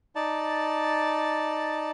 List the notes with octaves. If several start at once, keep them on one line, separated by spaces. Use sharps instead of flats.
D#4 D5 A5